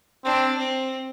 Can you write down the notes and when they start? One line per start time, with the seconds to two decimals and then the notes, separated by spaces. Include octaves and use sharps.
0.25 C4 D4
0.58 C4